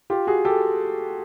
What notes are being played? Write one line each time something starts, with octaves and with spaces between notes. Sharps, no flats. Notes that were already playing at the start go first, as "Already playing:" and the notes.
F4 G4
F#4 G#4
G4 A4